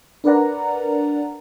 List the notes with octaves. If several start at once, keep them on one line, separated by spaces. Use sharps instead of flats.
D4 A#4 B4 D5 F#5 A#5